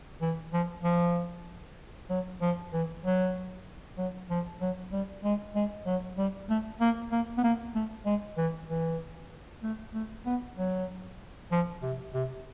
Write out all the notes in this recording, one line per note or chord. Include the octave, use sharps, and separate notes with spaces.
E3
F3
F3
F#3
F3
E3
F#3
F#3
F3
F#3
G3
G#3
G#3
F#3
G3
A3
A#3
A#3
B3
A#3
A3
G#3
E3
E3
A3
A3
B3
F#3
F3
C3
C3